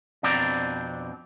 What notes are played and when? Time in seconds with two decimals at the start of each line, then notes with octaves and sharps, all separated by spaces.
0.23 F2 B2 C4 D4 D5 A#5